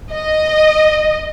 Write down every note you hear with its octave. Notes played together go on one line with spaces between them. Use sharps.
D#5